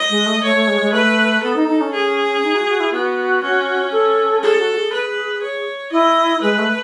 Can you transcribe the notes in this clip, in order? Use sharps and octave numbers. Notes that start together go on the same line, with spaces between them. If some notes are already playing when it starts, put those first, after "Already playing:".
Already playing: D#5
G#3
A3
A3 C#5
A3
G#3
G#3
A3 B4
B3 A4
D#4
D#4
C#4
G#4
D#4
F#4
F#4
E4
B3 F#4
C#4
A4
G#4 A4
F#4
G#4
B4
C#5
E4 D#5
G#3 B4
A3